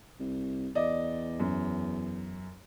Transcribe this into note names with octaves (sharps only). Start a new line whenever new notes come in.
C2
E2 D5 D#5
F#2